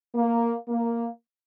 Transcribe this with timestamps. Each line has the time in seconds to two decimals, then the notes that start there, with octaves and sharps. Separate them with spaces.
0.15 A#3
0.69 A#3